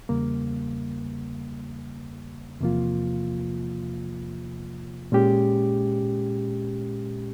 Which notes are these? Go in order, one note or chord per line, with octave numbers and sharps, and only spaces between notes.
E2 C#3 G3 A#3
E2 C3 F3 A#3 F4
A#2 G#3 C#4 G4